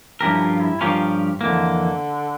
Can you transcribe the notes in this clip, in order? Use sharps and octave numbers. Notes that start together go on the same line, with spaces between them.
G2 F3 C#4 E4 G4 A#4
F4
E4
G2 F3 C#4 F4 G4 A#4
F2 D3 E3 A#3